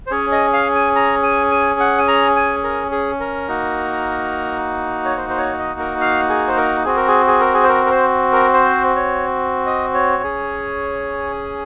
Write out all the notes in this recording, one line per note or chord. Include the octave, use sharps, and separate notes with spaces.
C5
C#4 G#4 C#5
D#5
F5
G#5
A#5
G#5
G#5
F#5
G#5
A#5
G#5
A#4
G#4
A#4
A#3 D#4 F#4
C#5
C5
C5
C#5
D#5
A#4
F5
G#4
C5
A#4
C4 F#4 G#4
A#4
G#4
G#4
A#4
G#4
C5
A#4
A#4
C5
A#4
C5
C#5
D#5
C#5
C#4 G#4